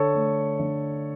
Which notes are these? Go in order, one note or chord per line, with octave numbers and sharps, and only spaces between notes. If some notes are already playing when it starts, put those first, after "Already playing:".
Already playing: D3 A4 C#5
A3
D3